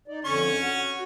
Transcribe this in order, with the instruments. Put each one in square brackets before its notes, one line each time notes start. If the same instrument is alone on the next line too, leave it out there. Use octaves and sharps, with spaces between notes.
[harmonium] D#4 D5
[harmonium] F2 D3 [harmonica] C#4 C#6
[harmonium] F#4 F#5